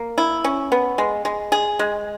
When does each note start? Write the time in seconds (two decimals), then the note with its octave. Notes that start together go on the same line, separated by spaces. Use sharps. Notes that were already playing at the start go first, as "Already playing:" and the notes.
Already playing: A#3
0.18 E4
0.44 C#4
0.72 B3
0.98 G#3
1.25 G#3
1.52 G#4
1.79 G#3